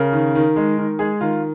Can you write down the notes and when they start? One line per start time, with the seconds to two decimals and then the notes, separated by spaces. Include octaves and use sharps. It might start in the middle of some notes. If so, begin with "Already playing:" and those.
Already playing: C#3 A#4
0.13 D#3
0.35 D#3
0.56 G#3
0.78 D#3
0.99 G#3 G#4
1.20 D#3 F4